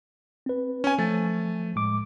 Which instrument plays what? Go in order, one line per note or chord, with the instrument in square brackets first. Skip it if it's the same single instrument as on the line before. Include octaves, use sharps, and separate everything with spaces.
[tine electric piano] C4 B4
[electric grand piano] C#4 G#5
[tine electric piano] F3 A6 [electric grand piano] A3
[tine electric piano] A2 G#3 D6